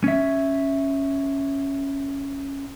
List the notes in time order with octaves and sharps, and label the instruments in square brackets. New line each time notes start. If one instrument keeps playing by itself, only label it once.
[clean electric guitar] C#4 E5